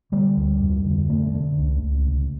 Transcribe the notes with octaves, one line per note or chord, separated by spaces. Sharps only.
D3 G3
D2
F2
D3
F2 A3
D3
C#2
C#2
C#3